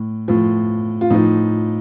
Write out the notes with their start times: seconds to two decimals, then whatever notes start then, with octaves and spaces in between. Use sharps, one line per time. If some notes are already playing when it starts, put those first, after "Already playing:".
Already playing: A2
0.28 A2 F3
1.01 F4
1.10 A2 F3 D#4